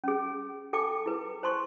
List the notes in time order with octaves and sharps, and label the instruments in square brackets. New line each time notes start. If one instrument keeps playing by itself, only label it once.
[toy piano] C#4 G#4
A4 G5 A5 D6
E4 G#4 B4
C5 A5 C6 C#6